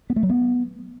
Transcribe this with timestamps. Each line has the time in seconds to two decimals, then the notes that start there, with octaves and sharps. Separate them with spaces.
0.10 B3
0.16 A3
0.23 F#3
0.29 B3